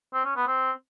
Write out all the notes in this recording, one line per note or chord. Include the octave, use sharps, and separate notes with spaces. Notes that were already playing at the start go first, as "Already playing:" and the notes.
C4
C#4
B3
C4